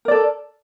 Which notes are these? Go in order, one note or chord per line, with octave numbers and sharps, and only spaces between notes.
A4 A#4 D5